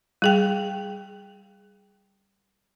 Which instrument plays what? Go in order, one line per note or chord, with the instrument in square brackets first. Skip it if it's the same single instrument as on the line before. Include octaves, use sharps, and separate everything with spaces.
[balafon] G3 G#4 G5